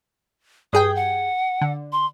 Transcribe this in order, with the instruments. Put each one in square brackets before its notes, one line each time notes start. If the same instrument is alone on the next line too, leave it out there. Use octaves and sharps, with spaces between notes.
[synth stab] G2 G#4 G5 [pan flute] D#6
[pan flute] F#5
[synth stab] D3
[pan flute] C6